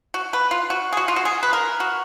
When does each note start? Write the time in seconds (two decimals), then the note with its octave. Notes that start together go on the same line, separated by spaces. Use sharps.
0.14 F#4
0.33 B4
0.51 F4
0.70 F#4
0.93 G#4
0.97 F#4
1.08 F4
1.16 F#4
1.25 G#4
1.43 B4
1.53 A#4
1.80 F#4